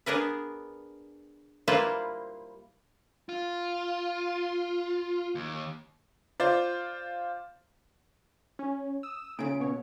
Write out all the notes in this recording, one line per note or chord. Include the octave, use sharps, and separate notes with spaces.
B3 D4 G#4 A#4 B4
G3 A#3 E4 F4 B4 C5
F4
D#2
F4 C5 D5
C#4
D#6 E6
A#2 C#3 D7
B2 C#5